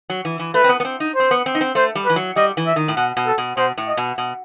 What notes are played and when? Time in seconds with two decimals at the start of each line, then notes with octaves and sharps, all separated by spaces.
0.10 F#3
0.25 E3
0.39 E3
0.54 A3 B4
0.64 C4
0.69 B3
0.80 B3
0.85 C4
1.00 D#4
1.15 C4 C5
1.31 B3
1.46 C4
1.55 D#4
1.61 C4
1.75 A3 C5
1.95 G3
2.05 B4
2.09 E3
2.16 F#3
2.36 G3 D#5
2.57 E3
2.67 E5
2.76 D#3
2.88 A2
2.96 B2 F#5
3.17 B2
3.27 A4
3.38 B2
3.57 B2 C5
3.78 A2
3.88 D#5
3.97 B2
4.18 B2